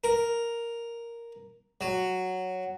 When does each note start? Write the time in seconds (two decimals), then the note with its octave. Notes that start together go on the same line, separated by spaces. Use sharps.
0.04 A#4
1.81 F#3